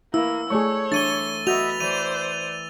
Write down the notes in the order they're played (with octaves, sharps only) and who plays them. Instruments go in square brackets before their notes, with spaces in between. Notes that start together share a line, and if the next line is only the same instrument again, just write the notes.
[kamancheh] A#3 [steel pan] E4 [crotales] E6
[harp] A3 [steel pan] G#4 D5 C#6 [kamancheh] C#5
[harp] E3 [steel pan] D4 [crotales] A6 D#7 G7
[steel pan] F#4 [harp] B4 C#6 G6 [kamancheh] D#5 E5 [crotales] F7
[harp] E3 [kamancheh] C5 D5 [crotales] D#7